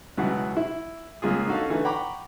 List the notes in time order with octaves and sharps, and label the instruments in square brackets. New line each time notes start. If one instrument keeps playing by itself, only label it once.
[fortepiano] C#2 B2 E3 F#3 F#5
E4
C#2 A#3 F4 G#4
C#4 D#4 F#4 A4 F5
D3 E3 A3 D#4
F#5 G5 A#5 B5 C#6 D6